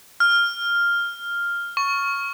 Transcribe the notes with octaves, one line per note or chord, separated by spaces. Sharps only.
F6
C#6